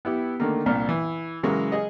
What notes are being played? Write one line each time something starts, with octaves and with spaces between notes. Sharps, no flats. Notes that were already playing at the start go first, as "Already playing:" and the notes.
B3 E4 G4
D3 D#3 A3 A#3
C2 A#2 D4 F6
E3
C#3 E3 F#3 G#3 F#4 A#4
G#4 D#5